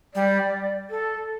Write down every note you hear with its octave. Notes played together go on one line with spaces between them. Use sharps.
G3 D5
A4